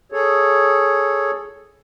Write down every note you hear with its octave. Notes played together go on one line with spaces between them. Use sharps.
G#4 A4 C#5